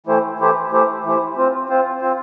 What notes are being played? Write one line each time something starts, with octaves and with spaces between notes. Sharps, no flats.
E3 A3 E4 G4 C5
E3 A3 E4 G4 C5
E3 A3 E4 G4 C5
E3 A3 E4 G4 C5
C4 F4 C5
C4 F4 C5
C4 F4 C5